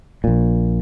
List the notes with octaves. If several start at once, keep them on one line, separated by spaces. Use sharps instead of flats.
A#1 A#2